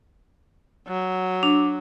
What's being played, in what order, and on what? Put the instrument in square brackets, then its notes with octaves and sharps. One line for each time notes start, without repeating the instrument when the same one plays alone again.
[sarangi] F#3
[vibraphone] D4